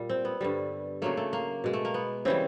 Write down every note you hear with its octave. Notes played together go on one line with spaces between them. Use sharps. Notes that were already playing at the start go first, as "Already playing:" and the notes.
Already playing: A#2 G3
C4
B3
G2 D3 G3
C#3 F#3 A3 A#3
A3
A#3
B2 G#3
A3
A#3
B3
C#3 E3 G3 C4